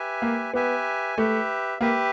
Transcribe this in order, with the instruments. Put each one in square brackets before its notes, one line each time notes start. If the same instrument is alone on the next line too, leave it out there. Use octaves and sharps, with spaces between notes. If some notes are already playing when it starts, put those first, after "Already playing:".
Already playing: [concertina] G4 B4 E5 G#5
[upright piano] A#3
[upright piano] B3 [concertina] G4 B4 E5 G#5
[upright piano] A3 [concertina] G4 B4 E5
[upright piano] A#3 [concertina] G4 B4 E5